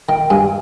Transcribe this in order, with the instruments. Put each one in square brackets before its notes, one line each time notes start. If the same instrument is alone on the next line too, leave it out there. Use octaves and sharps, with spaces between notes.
[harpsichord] D#3 [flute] G5
[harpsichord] G2 [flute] G#5